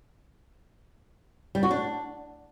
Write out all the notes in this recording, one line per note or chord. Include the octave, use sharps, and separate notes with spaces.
G3
F#4
D4